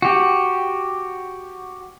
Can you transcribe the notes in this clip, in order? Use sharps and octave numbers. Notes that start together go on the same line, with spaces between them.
F#4 G4